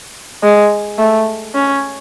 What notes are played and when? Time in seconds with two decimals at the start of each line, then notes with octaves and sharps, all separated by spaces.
0.43 G#3
0.98 A3
1.55 C#4